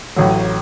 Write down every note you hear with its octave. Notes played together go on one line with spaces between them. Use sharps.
A1 A2 F#3